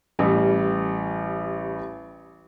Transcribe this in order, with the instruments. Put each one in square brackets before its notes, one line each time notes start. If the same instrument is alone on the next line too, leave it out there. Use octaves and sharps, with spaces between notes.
[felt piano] A1 G3